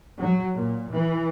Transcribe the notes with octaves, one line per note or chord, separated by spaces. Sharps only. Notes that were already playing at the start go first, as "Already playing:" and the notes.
F#3
A#2
E3